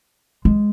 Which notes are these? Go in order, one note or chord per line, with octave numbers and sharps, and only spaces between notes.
G#3